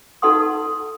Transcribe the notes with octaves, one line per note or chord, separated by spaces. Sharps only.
D#4 A4 B4 F#5 C6 D#6